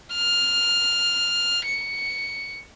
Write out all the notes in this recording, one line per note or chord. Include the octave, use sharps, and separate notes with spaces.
F6
C#7